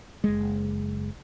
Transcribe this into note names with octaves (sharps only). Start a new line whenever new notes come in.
F#1 G#3